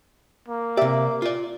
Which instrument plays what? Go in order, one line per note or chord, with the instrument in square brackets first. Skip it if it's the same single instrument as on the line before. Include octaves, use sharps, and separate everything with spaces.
[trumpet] A#3
[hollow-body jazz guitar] C3 D5 [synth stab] G4 E5
[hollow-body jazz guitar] F4 D5